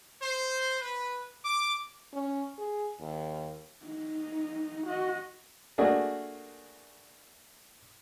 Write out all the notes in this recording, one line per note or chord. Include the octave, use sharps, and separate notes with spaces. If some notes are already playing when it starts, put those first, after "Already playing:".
C5
B4
D6
C#4
G#4
D#2
D#4
F#4 D#5
A3 A#3 D4 F#4 G#4